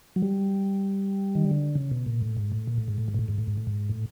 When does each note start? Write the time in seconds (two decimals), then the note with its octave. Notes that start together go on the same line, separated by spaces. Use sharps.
0.16 F#3
0.22 G3
1.35 D#3
1.44 D3
1.75 C#3
1.91 B2
2.06 A#2
2.22 A2
2.37 G#2
2.52 A2
2.67 A#2
2.78 A2
2.88 G#2
2.98 A2
3.08 G#2
3.14 A#2
3.19 A2
3.28 G#2
3.38 A2
3.47 G#2
3.57 A2
3.67 G#2
3.89 A2